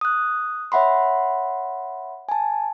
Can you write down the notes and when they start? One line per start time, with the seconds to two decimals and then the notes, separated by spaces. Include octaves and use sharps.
0.01 D#6 F#6
0.72 C#5 E5 F#5 B5 C6
2.29 G#5 A5